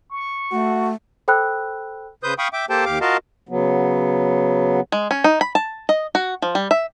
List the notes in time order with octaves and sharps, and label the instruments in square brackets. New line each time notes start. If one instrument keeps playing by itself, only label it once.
[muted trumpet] C#6
[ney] A3 [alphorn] F#4
[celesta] A4 C5 G5 B5 E6 F#6
[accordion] C#3 B4 C5 D#6 G6
F5 G5 B5 C#6 D#6
E5 G5 D6
A#3 G4 A4 C5 G5 A5
D#2 G4 F5 D6
F4 F#4 A#4 D#5 F5 A5
[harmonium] C#3 F#3 B3
[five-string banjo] G#3
C#4
D#4
B5
A5
D#5
F#4
F3
G3
E5